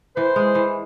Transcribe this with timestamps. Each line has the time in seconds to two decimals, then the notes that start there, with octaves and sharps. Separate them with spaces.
0.16 E3 C5
0.36 G#3
0.55 E3